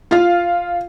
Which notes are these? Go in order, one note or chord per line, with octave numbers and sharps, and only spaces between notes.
F4 F5